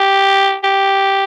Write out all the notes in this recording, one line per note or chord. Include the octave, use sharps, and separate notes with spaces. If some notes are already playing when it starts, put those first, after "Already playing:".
Already playing: G4
G4